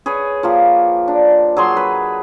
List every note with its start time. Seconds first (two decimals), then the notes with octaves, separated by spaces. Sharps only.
0.06 G#4 B4 C#5 G#5
0.43 F3 A#3 G4
1.08 D4
1.57 F#3 G#4 C6
1.77 B4